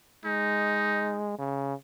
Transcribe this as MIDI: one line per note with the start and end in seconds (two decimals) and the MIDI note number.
0.25 1.38 56
0.25 1.23 63
1.39 1.74 49